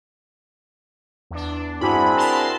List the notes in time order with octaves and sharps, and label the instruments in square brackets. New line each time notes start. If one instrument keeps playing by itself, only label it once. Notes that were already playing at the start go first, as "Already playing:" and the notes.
[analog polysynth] E2 D4
[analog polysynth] G2 [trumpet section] C4 D4 G#4 [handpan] E4 F#4 [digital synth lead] B5
[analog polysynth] A#4 A5 C6